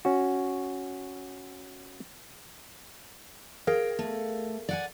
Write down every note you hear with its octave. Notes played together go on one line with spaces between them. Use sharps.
C#4 F#4
G#4 A#4 F5 G5
A3
D5 F#5 G#5